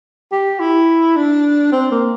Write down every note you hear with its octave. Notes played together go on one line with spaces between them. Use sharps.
G4
E4
D4
C4
A#3